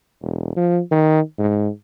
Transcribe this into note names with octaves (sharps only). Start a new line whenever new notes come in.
E1
F3
D#3
G#2